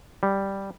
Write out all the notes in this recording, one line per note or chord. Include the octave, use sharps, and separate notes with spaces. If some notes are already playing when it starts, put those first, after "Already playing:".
G3